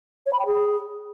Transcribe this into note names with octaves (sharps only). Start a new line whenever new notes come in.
C#5
B5
G5
G#4